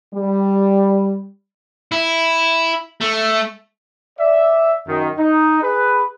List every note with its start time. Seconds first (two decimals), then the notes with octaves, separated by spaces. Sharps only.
0.13 G3
1.92 E4
3.01 A3
4.19 D5 E5
4.87 F#2 D#3
5.18 D#4
5.63 G#4 B4